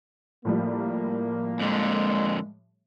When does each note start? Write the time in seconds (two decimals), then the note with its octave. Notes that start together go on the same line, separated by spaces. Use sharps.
0.45 A2 F3 G3 A#3
1.59 F2 D3 G#3